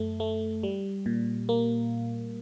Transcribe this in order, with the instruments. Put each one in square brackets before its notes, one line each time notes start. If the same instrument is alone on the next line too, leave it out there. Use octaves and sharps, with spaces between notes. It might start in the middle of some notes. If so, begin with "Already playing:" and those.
Already playing: [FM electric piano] F#2 A3
A3
G3
A#2
A#3